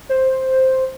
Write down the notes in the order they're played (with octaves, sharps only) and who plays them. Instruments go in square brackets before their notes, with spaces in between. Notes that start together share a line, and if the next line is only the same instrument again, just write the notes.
[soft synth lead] C5